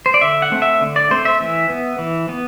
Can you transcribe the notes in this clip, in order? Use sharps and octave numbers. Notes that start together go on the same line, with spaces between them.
C5
D5
D3 E5
F#5
A3 C4
E5
D3
D5
A3 C4 C5
E5
E3
B3
E3
B3